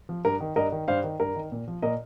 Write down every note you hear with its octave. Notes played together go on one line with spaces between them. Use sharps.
F3
G2 A#4
D#3
G2 A#4 D#5
D#3
G2 C5 F5
D#3
G2 A#4
D#3
A#2
F3
A#2 A#4 D#5